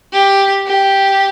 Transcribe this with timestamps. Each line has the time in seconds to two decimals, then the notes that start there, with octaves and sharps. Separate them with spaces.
0.12 G4
0.67 G4